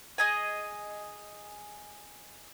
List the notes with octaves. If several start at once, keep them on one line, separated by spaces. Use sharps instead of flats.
G#4 D#5 G#5